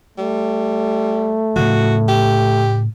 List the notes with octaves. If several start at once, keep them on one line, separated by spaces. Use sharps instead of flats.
G3 A3
A2 C#3 F3 F#4
G4